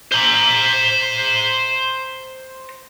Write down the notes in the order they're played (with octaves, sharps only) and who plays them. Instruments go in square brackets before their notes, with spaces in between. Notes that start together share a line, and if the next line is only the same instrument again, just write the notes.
[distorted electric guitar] C5 A#5